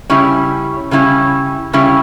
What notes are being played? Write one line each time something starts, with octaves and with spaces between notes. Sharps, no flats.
C#3 G3 C#4 E4
C#3 G3 C#4 E4
C#3 G3 C#4 E4